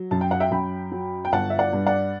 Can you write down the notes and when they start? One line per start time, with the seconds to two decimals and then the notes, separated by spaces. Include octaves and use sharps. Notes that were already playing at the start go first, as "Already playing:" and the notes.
Already playing: F#3
0.11 F#2 A5
0.21 G5
0.31 F#5
0.40 E5 G5
0.51 F#2 G5 B5
0.92 F#3
1.25 G5
1.32 G1 F#5 A5
1.50 E5
1.58 D5 F#5
1.73 G2
1.87 D5 F#5